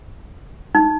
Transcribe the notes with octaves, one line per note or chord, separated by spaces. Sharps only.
D#4